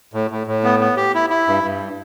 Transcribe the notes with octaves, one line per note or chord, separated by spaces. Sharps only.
A2
A2
A2
B3
B3
G4
E4
E4
G2
G2